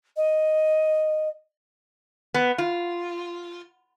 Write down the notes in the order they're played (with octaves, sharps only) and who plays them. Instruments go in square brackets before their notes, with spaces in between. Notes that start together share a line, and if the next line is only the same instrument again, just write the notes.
[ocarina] D#5
[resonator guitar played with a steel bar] B3
F4